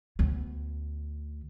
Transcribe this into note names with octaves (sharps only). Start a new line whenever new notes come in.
D2 B3